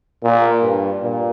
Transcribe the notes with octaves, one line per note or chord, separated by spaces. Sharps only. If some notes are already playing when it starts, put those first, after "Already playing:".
A#2
G2
A#2